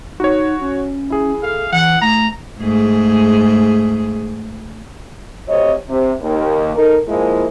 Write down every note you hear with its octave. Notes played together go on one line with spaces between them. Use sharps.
D#4 F#4 C#5
C#4
E4 G#4
A4 F5
E3 F#5
A3 A#5
G#2 A3 G#4
D2 C3 C4 C#5 D#5
C3
D#2
D#4 A4 A#4
F3 G#3 A#3 E4